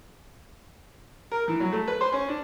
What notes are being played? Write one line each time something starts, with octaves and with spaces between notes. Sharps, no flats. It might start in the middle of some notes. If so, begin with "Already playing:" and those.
A#4
E3
F#3
A3
B4
C5
C#4
D4